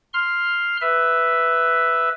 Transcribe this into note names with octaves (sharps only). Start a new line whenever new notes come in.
C6 F6
B4 E5